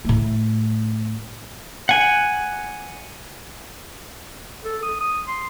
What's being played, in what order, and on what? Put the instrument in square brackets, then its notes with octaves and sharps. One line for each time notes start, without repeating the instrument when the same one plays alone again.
[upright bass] A2 A3
[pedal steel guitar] F#5 G#5
[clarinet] A4
D#6
D#6
C6